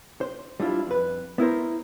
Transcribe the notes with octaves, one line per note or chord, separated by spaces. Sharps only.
C5
G3 D4 E4 F4
F2 B4
B3 E4 A#4 C5